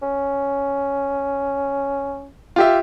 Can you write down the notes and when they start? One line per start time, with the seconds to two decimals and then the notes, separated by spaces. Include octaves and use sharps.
0.02 C#4
2.56 F4 G4 E5